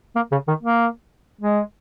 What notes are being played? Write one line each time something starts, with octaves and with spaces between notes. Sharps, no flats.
A#3
C#3
D#3
A#3
G#3